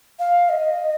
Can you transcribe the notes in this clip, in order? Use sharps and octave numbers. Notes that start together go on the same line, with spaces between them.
F5
D#5